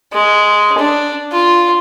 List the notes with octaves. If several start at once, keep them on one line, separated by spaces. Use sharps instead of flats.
G#3
D4
F4